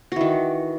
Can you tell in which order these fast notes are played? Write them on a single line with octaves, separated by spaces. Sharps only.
F#4 E3 D#3